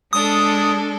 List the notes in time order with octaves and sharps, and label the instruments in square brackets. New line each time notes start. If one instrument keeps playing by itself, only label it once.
[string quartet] G#3 D4 A4 [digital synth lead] D#6